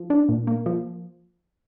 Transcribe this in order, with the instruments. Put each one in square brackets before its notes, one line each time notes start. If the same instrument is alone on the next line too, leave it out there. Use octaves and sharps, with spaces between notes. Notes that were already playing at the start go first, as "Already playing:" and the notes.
Already playing: [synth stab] F3
D4
A#2
A#3
F3